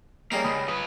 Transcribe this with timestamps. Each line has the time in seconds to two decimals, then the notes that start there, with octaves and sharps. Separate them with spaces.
0.32 C#3 G3 A#3 D#4
0.44 C#2 B5 D#6
0.68 F4 B4 D#6